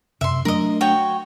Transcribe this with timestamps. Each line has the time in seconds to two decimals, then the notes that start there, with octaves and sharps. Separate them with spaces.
0.21 F#2 C3 E5 C6
0.45 F#3 A3 D4 A#4 D#5
0.81 F#4 C#5 G5